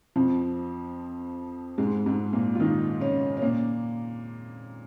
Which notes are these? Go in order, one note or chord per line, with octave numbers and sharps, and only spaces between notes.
F2 F3
G#2 G#3
G#2 G#3
A#2 A#3
F4
D#3 D#4
C#3 C#4
C#4
A#2 A#3